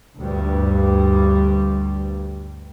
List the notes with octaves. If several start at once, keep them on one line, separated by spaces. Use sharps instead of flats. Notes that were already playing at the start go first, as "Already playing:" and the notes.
D2 G2 G3